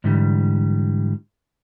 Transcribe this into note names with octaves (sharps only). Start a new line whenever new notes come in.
G#2 D3 E3 G3